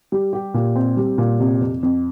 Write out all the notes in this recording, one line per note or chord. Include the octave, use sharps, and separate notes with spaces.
G3
G4
A#2
C4
G3
A#2
C3
F2
F2